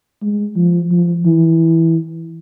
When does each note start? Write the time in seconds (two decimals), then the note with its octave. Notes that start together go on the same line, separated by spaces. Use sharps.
0.22 G#3
0.56 F3
0.91 F3
1.26 E3